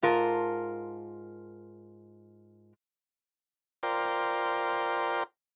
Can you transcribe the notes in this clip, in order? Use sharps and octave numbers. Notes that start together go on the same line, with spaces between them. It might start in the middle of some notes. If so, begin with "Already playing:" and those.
G#2 F4 A#4 A5
F4 A#4 C5 D5 G5